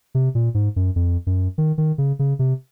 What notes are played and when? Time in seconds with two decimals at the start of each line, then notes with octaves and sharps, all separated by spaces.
0.15 C3
0.35 A#2
0.54 G#2
0.76 F#2
0.96 F2
1.27 F#2
1.58 D#3
1.78 D#3
1.98 C#3
2.19 C#3
2.39 C3